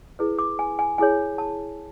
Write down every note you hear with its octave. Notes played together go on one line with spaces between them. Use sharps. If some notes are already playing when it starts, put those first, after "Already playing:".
E4 G#4 B4
D6
G#5
G#5
E4 G#4 C#5 G#5
A5